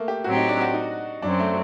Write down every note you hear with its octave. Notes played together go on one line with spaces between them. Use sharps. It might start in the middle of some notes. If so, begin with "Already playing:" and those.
Already playing: A3 A#3
G4
A2 F#3 C4 F#4 G4
D#4
D4
F#4
D#4
F#2 F#3 C4 D4
A3